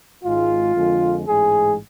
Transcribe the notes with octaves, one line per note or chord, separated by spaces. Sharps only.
G#1 G#2 G#3 F4
F2 D3 G#3
A1 G#2 G#3 G#4